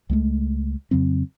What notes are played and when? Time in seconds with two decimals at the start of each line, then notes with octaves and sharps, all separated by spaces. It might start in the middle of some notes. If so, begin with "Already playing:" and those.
0.10 C#2 G#3 A3
0.91 F2 C#3 F#3 C4